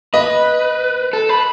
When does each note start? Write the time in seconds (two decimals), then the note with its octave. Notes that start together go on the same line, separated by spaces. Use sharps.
0.14 B4 D#5
1.13 A4
1.29 B4